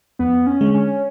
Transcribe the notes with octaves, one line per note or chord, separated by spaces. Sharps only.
F2 B3
C#4
D3 G#3
C#4